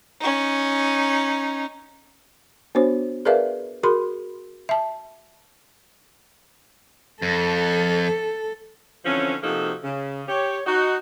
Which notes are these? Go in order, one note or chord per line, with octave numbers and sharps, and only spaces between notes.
C#4 D#4
B3 D4 F#4 C5 C#5
G#4 A#4 B4 D5 E5 F5
F#4 G#4 A#4 B5 C6
E5 A5
F2 A4
D3 E3 F3 C4 C#4
C3 F3 A#3 D#4 F#4 A4
C#3
G4 C#5
D#4 F#4